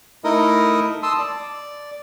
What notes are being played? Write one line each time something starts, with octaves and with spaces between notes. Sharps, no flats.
A3 D#4 E4 A#4 D#5 D#6
A5 C6 D#6 E6
D5